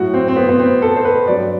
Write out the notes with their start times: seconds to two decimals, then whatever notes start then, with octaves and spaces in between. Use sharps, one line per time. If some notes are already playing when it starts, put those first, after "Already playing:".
Already playing: A2 F#3 F#4
0.14 C4
0.28 C4
0.36 B3
0.49 B3
0.59 C4
0.82 A4
0.96 C5
1.05 B4
1.28 G2 F#3 D5